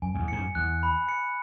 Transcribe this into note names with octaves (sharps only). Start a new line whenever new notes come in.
F#2 G#5
F#2
E2
G#2 C#7
F#2
E2 F#6
B5
C#7